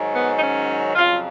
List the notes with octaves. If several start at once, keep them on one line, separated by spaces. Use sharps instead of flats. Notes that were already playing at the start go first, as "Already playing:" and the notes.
Already playing: G#2 D#3 F#3
B3
D#4
C#4
F2 C#3 F#3 F4